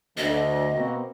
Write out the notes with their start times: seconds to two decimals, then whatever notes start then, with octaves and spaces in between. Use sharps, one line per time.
0.17 D2 D#5
0.73 B2 A#3 C4